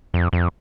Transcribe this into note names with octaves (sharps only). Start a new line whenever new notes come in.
F2
F2